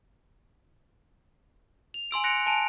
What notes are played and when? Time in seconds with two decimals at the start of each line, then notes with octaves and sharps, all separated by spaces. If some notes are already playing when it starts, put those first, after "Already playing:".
1.94 F7
2.11 G#5 C6 E6 D7
2.24 F#6 A#6 C#7 D7 F7
2.46 G#5 A5 D7 F7